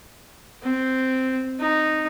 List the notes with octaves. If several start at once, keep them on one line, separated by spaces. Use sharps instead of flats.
C4
D#4